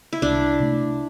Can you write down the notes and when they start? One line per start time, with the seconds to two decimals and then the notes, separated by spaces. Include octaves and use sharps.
0.13 E4
0.22 C2 D4
0.60 C3 A3